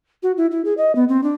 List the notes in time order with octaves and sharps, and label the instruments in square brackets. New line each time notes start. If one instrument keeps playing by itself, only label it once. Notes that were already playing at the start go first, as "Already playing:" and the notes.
[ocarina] F#4
E4
E4
G#4
D#5
B3
C4
D4